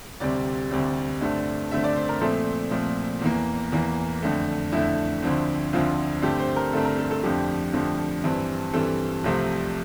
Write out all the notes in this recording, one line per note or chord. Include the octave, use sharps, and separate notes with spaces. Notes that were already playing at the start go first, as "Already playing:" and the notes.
D2 C3 G3 C4 D5
D2 C3 G3 C4
G2 D3 A3 C4
G2 D3 A3 C4 E5
D5
C5
A#4
A#2 F3 A3 C4 A4
A#2 F3 A3 C4
E2 E3 A#3
E2 E3 A#3
F2 D3 A3
F2 D3 A3 E4
D2 D3 F3 C4
D2 D3 F3 C4 F4
G2 D3 A3 C4 G4
C5
A#4
G2 D3 A3 C4 A4
A#4
A4
A4
F2 D3 F3 A3 G4
F2 D3 F3 A3
G2 E3 G3 C4
G2 E3 G3 C4 A4
C2 C3 F3 A3 C4